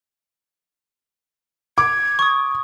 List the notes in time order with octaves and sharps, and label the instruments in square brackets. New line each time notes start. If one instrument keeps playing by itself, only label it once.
[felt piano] D6 [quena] G#6
[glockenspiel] C#6 D#6